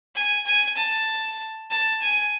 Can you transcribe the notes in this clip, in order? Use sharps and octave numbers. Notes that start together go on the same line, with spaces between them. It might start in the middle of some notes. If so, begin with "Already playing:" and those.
G#5
G#5
A5
A5
G#5